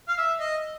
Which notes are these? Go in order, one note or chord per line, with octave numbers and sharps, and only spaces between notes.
F5
E5
D#5